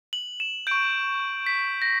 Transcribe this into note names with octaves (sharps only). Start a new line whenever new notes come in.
F#7
E7
C#6 G6 D7
B6
A#6